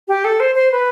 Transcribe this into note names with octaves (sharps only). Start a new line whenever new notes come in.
G4
A4
C5
C5
B4